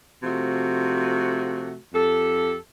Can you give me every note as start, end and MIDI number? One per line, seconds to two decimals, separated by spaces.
0.23 1.75 48
0.23 1.75 53
0.23 1.75 57
0.23 1.75 66
1.93 2.55 41
1.93 2.55 67
1.93 2.55 69